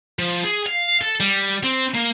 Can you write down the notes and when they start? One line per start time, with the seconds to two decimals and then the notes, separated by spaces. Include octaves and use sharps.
0.19 F3
0.44 G#4
0.66 F5
1.01 A4
1.20 G3
1.64 C4
1.94 A#3